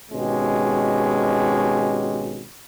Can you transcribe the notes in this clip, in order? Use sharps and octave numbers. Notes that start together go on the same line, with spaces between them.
G#1 B2 G#3 C#4 G4